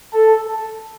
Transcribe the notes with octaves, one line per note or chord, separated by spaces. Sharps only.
A4